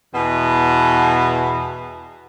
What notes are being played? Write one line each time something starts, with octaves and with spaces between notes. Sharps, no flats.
E2 B2